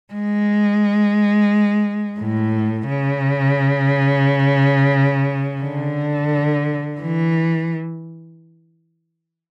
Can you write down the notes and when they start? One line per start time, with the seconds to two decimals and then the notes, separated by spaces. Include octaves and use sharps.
0.13 G#3
2.20 A2
2.89 C#3
5.63 D3
7.01 E3